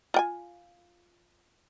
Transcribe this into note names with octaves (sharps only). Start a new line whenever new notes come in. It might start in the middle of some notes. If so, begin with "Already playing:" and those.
F4 G5 G#5